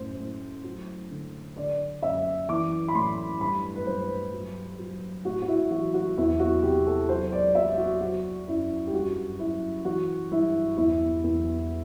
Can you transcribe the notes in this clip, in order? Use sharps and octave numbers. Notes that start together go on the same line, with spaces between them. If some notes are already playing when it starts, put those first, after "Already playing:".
Already playing: F#2 A2 C5
A2
F#3
D3
D3 D5
F#2 E5
E3 D6
B5
A2 C6
G2 B5
B4
G2 C5
F#3
F#3
A2 F#4
F#4
E4
E3 F#4
F#4
E2 E4
F#4
C3 G4
A4
F#3 C5
D5
F#3 E5
F#4
F#3 F#4
F#2 E4
G4
G2 F#4
F#3 E4
E3 F#4
G2 E4
E2 E4
E2